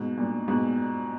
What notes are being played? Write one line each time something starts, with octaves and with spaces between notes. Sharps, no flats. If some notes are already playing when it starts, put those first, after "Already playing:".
Already playing: G#2 B2
G2 A#2
G#2 B2